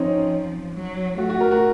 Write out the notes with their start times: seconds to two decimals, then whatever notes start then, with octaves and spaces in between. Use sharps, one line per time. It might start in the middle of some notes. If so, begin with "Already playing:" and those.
Already playing: F3 C4 C#4 D#4
0.73 F#3
1.18 A3 F#4
1.29 F#4
1.40 A#4
1.51 F#4